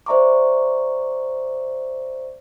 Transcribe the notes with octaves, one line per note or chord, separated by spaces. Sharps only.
C5 D5 E5 A#5 C#6 D6